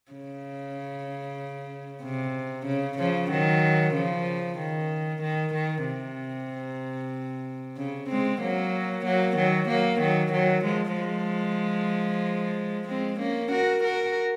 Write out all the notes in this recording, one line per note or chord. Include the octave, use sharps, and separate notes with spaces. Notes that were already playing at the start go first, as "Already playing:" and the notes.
C#3
C3
C#3
C#3 F3
D#3 F#3
C#3 F3
D#3
D#3
D#3
C3
C#3
G#3 C4
F#3 A#3
F#3 A#3
D#3 F#3
F#3 A#3
D#3 F#3
D#3 F#3
F3 G#3
F3 G#3
G#3 C4
A#3 C#4
F#4 A#4
F#4 A#4